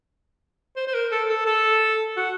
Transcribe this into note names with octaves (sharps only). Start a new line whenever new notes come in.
C5
C5
A#4
A4
A4
A4
F#4